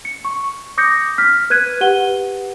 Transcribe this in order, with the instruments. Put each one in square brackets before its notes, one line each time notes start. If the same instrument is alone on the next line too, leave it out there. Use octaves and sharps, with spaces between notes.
[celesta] C#7
C#6
D6 D#6 G6 A#6 C#7
F6 B6
B4 F#6 G#6 D#7
G4 B4 F#5 D#7 G7